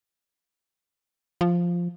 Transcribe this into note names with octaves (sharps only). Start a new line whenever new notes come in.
F3